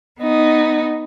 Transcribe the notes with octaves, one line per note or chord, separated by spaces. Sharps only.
B3 D#4